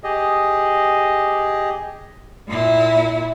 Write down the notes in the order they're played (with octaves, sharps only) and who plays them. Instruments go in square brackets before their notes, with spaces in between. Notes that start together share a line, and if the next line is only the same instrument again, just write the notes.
[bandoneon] G4 G#4 D#5
[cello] A#2 E4